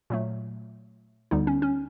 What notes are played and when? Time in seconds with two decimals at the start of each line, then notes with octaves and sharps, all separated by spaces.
0.10 A#2 F#3 A3
1.31 D2 D3 G3 B3 D#4
1.47 C#4
1.62 C#4